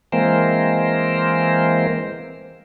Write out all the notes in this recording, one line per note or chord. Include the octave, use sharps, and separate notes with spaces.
E3 G#3 A#3 C4 A#4 C5